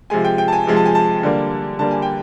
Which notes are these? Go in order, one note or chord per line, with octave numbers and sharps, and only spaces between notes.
C3 F3 G#3 G#5
G5
G5
A5
G#5
C3 F3 G#3
A5
G#5
A5
D3 G3 A#3
D3 G3 A#3 A5
G#5
G5